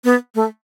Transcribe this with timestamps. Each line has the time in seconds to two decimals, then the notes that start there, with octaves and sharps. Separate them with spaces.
0.04 B3
0.35 A3